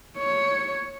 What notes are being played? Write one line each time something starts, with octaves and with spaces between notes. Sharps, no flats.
C#5